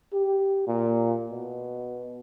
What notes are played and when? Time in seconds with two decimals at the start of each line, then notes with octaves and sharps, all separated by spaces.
0.13 G4
0.67 A#2
1.31 B2